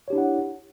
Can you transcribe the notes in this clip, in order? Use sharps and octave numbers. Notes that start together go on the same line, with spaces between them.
D4 E4 G4 C#5 F#5